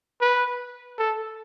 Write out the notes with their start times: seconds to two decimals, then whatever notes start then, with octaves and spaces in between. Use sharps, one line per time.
0.21 B4
0.99 A4